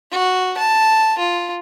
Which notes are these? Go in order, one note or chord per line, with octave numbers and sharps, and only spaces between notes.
F#4
A5
F4